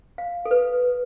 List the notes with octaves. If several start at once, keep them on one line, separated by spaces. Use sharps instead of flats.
F5
A4
B4